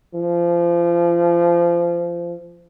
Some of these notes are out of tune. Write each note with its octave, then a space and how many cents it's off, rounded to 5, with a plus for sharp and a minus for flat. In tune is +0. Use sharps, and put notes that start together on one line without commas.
F3 -25